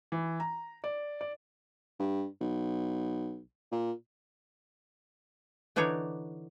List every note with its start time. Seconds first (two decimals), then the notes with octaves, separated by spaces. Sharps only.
0.12 E3
0.40 A#5
0.84 D5
1.21 D5
1.99 G2
2.41 B1
3.72 A#2
5.76 D3 E3 D4 D#4 C#5